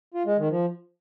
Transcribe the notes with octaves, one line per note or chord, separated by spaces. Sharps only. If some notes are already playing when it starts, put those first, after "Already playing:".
F4
G#3
D#3
F3